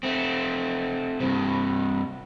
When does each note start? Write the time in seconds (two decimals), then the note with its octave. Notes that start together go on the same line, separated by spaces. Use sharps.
0.03 A3 C4
1.20 G2 C3